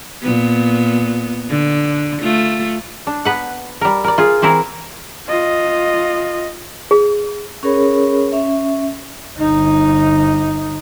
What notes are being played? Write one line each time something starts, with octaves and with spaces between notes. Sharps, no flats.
A#2 B3
D3
A3 F4
D4
B3 B4 F#5
G3 A#4
A#4 D5
F4 G#4
E3 C4 E4 A#4
F4 D#5
G#4
C#4 G#4 A#4 C#5 B5
C#4 E5
G1 D#4